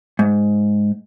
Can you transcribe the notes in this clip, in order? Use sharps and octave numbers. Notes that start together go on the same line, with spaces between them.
G#2